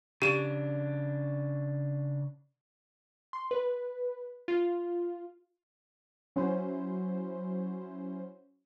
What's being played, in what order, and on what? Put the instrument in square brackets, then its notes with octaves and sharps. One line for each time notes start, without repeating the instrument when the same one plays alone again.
[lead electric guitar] C#3 D4 [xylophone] G4 E7
[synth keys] C6
B4
F4
F#3 C#4 E4 C5